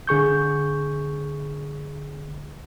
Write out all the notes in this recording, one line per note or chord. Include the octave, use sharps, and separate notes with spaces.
D3 G#4 C#6 G6